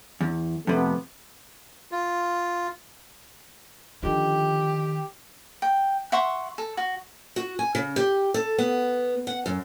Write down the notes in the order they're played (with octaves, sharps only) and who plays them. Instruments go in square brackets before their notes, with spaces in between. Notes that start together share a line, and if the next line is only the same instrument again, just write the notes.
[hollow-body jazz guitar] E2
[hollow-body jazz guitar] F2 C3 [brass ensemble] A3 B3
[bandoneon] F4
[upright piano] D3 F3 D#4 [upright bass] D#3 [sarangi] G4
[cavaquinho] G5
E5 F#5 C6 C#6
A4
F#4
[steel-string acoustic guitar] F#4
G#5
C#3
G4
A4
B3
F#5
F#2